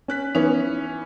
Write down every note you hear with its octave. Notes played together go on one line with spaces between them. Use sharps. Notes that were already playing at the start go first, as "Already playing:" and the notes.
C#4 F#6 B6
E3 B3 C#4 D#4